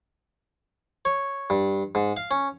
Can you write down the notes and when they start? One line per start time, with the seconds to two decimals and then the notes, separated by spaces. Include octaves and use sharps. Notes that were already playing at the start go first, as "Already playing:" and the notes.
1.05 C#5
1.50 G2
1.95 G#2
2.17 F5
2.31 C#4